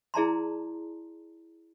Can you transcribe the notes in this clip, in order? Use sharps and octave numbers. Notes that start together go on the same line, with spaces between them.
E4 G#4 D5 A5 A#5 C6